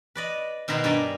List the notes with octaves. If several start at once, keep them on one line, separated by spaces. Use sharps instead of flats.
B4 D5 D#5
B2 D#3 B4 A#5 C6
G2 D5 G5 G#5 A#5